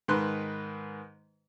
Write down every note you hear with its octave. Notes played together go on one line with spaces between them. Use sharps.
G#2 D#3 B4 C6 F#6